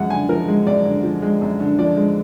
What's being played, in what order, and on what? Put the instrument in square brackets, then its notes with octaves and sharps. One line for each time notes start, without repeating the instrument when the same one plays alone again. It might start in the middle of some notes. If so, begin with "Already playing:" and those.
Already playing: [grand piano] F#2 F3 G#3 F#5
D3 G#5
F3 A#4
G#3
F#2 D5
D3
F3
G#3
F#2
D3
F3 D5
G#3